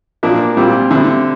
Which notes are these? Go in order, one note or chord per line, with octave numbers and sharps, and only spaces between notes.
A#2 F3 A#3 D4
A#2 G3 C4 F4
D3 G3 C4 E4